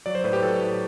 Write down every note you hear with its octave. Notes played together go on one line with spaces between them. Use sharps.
F#3 D5
C5
A2 B4
G4
F#3 A4
A2